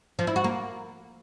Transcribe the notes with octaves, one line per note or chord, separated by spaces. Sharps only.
F3
E4
F#4
A#3